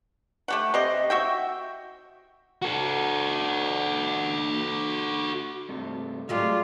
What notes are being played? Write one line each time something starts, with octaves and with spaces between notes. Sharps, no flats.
A3 G4 F#5
C3 G4 D#5
F#4 E5 G5
F#4 A4
G2 C3 A3
F#3 G#3 A3 F4 G4 D5